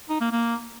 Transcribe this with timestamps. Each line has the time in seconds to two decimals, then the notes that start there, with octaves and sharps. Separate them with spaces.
0.09 D#4
0.20 A#3
0.32 A#3